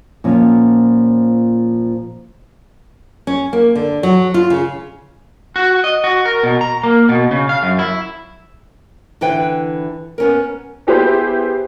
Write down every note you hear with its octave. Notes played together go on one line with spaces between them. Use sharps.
A#2 F3 C#4
C#4
A#3
D3
F#3
F4
C#3
F#4
D#5
F#4
A#4
B2
A#5
A#3
B2
C#3
F5
F#2
E4
D3 E3 E4 B4 G5
B3 C#4 A#4
B3 E4 G4 G#4 B4 C5